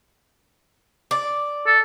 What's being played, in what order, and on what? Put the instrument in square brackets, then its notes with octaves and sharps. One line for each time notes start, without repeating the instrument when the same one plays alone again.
[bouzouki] D5
[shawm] A4